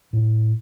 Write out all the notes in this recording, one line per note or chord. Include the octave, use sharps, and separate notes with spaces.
A2